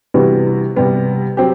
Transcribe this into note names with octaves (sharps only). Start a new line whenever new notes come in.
C3 E3 G3 B3 F#4
C3 G3 B3
F#3 C4 G4